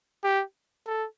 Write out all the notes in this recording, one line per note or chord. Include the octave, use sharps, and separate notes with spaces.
G4
A4